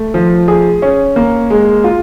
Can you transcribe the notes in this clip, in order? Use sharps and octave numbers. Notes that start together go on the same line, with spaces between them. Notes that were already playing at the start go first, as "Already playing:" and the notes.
Already playing: A3
F3
G#4
C#4
A#3
G#3
F4